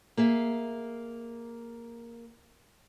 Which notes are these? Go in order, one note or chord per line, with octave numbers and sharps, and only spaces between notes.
A#3 G#4 E5